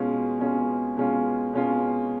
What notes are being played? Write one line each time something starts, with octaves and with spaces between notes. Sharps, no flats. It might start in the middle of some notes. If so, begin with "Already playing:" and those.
Already playing: B2 G#3 C#4 F4
B2 G#3 C#4 F4
B2 G#3 C#4 F4
B2 G#3 C#4 F4